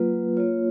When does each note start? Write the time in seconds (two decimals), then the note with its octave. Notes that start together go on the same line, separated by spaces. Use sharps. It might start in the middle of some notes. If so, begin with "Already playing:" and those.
Already playing: F#3 A#3 F4 B4
0.37 A#3 F4 C#5